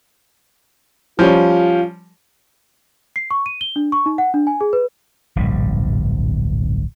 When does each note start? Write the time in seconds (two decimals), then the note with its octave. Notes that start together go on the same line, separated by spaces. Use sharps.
1.19 F3 G3 C#4 F4
3.16 C7
3.31 C#6
3.46 D#7
3.61 G7
3.76 D4
3.92 C#6
4.06 D#4
4.18 F#5
4.34 D4
4.47 G#5
4.61 G#4
4.73 B4
5.36 D1 A#1 G2 G3